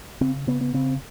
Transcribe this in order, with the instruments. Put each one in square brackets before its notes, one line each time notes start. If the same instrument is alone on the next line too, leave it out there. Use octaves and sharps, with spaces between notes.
[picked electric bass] C#3 C4
C#3 B3
B3
C#3 C4